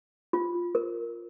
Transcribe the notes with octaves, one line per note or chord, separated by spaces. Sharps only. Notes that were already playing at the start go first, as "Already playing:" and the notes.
F4
A#4